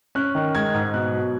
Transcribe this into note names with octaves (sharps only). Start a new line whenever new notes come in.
C#4 F#6
D#3
G#3 G#6
G#2
B2 F#6
F#3